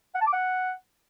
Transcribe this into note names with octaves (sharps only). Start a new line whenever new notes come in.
F#5
A5
D6
F#5